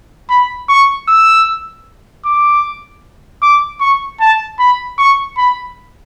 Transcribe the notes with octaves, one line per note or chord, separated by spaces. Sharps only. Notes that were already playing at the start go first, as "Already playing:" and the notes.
B5
C#6
E6
D6
D6
C#6
A5
B5
C#6
B5